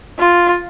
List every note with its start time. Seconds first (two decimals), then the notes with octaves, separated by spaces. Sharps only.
0.18 F4